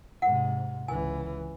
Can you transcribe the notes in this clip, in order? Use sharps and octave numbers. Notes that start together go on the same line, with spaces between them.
G#2 C3 F#5
C#2 E3 G#5